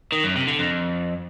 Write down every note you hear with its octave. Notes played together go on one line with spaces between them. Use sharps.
D#3
F#2
C3
D3
F2